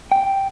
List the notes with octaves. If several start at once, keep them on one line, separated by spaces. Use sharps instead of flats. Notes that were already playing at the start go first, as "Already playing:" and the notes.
G5